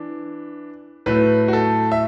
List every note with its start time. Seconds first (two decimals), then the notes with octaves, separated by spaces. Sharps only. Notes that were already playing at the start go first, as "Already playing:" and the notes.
Already playing: E3 D4
1.06 A2 F#3 A3 B4
1.48 F#4
1.53 A4
1.92 E5